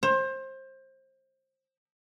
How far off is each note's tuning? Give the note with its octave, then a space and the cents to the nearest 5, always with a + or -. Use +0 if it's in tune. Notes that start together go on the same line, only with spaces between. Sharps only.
C5 +25